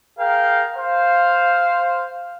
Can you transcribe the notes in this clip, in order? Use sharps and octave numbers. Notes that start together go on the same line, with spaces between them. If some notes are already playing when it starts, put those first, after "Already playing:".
G#4 A#4 F5 G5
C5 F5